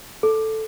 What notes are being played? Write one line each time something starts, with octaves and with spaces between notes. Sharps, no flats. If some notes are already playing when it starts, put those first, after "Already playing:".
A4